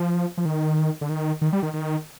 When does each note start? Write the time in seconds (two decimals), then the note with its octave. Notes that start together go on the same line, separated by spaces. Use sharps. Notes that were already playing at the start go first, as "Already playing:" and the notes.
Already playing: F3
0.38 F3
0.45 D#3
1.01 D3
1.09 D#3
1.41 D#3
1.53 G3
1.63 D#3
1.74 D#3